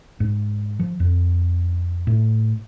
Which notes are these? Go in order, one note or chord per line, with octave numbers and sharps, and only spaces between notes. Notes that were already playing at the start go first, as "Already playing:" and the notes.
G#2
F3
F2
A2